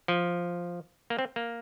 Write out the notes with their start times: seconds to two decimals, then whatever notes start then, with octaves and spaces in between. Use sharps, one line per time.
0.08 F3
1.10 A#3
1.19 C4
1.36 A#3